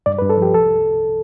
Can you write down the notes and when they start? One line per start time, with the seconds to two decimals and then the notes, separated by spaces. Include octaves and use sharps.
0.06 G2 D5
0.19 B4
0.22 G2
0.30 A4
0.37 F3 G4
0.54 C2 A4